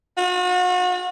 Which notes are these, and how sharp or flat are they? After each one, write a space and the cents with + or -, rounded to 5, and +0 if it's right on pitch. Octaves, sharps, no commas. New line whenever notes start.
F#4 -40